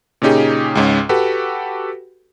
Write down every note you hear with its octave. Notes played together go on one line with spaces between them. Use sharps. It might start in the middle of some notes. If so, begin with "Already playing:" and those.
A#2 C#3 C#4 D#4 G4 G#4
C#2 G#2 C#4
F#4 G4 A4 B4